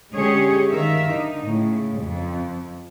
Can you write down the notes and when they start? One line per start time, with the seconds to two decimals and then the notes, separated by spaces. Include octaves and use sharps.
0.14 D3 G#3 C#4 G4 G#4 C#5
0.72 D#3 A#4 E5 F5
1.09 D3 D#4
1.43 A2 C#3
1.99 F2